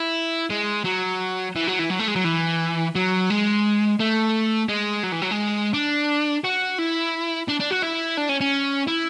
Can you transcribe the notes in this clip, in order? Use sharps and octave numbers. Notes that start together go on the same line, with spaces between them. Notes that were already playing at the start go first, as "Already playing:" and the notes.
Already playing: E4
G#3
F#3
E3
F#3
E3
F#3
A3
G#3
F#3
E3
F#3
G#3
A3
G#3
F#3
E3
F#3
G#3
D4
F#4
E4
D4
D4
F#4
E4
D4
C#4
C#4
E4